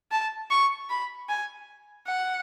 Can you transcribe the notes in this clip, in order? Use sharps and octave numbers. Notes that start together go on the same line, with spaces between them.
A5
C#6
B5
G#5
F#5